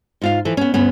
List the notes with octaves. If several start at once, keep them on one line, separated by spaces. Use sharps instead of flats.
G#2 F4 F5
E3 F3 A4
B3 C#4
D2 G2 B3 C#4